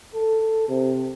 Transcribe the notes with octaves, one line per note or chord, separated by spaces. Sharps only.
A4
C3